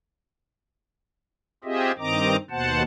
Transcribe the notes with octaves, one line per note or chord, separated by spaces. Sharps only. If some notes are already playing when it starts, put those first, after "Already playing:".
C4 F4 G4 G#4 D#5 E5
G2 D#3 C4 D#5 A#5 D6
D#2 B2 C5 F#5 A5